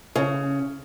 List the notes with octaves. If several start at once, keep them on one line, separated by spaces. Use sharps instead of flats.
C#3